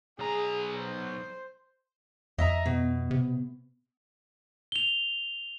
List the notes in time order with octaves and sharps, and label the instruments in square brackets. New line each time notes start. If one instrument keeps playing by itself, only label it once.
[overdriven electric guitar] B1 A#5 [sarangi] G#4
[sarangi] C5
[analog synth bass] F2 [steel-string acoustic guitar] D#5 E5 A#5
[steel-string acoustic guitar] B2
[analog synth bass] C3
[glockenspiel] F7 G7